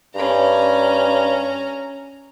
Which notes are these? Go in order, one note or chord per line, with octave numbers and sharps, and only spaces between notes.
G2 C#4 A#5